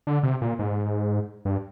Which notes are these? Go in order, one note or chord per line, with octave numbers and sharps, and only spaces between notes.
D3
C3
A#2
G#2
G2